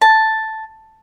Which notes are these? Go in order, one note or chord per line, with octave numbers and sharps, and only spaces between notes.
A5